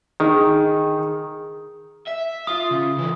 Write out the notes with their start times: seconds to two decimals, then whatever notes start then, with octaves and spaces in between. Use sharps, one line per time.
0.20 D#3 D#4 G#4
2.07 E5
2.47 F4 D#6
2.71 C#3
2.99 D3 E3